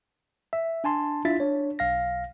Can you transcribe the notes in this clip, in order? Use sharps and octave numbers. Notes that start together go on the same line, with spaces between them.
E5
D4 G#5 A5 C6
D4 E4 F4 E5 A6 B6
D4 C#5
B1 F5 A#6